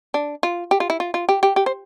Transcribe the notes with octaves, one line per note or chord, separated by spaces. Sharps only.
D4
F4
G4
F4
E4
F4
F4
G4
G4
G4
C5